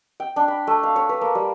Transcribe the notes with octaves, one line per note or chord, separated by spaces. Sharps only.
G5
D4
B5
A3
F5
C#5
B4
A#3
G3